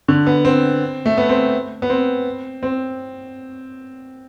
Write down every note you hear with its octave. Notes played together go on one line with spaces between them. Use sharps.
D3
B3
C4
A3
B3
C4
B3
C4
C4